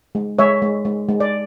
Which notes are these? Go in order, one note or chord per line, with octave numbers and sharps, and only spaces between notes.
G#3
G#3 C#5 E5
G#3
G#3
G#3
D5